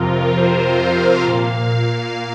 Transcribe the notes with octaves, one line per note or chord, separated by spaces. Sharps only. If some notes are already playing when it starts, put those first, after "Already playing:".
Already playing: F2 C3 F3 F4 A#4
C5
F5
A#2 A#3 F5
F5